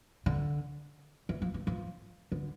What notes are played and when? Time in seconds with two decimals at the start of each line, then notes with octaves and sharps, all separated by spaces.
0.26 D3
1.29 E3
1.42 F3
1.54 E3
1.67 F3
2.32 D3